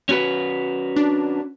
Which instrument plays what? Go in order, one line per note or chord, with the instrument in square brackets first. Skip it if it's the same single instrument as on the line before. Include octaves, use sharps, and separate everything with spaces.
[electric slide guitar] C#4 F#4 B4
[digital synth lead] D4